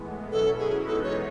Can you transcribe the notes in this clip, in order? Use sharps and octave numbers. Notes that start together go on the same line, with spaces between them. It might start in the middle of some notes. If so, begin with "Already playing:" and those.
Already playing: A2 E3 G#3 B3
B2 F#3 C#4 E4 A4
G#4
E3 G#3 B3 D#4 A4
C#5